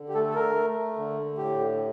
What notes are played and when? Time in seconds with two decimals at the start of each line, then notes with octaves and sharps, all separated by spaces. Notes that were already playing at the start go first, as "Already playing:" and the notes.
Already playing: D3
0.09 G4
0.14 A3 A4
0.30 A4
0.35 A#4
0.55 A3
0.97 D3
1.38 A2 G4